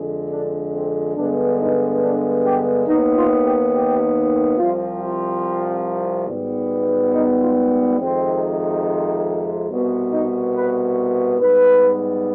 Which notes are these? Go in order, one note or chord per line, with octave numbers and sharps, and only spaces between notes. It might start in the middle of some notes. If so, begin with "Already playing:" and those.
Already playing: F2 D3 G#3
D4
C4
G2 D3 G#3 B3 D4
D#4
D4
G4
D#2 D#3 B3 D#4
F4
G4
G4
C2 C3 F3 C4 F4
F4
G#1 G#2 G3 B3
D#4
F4
F2 C3 D#3 G#3 C4
C2 B2 B3
D#4
B4
G#2 G3 B3 B4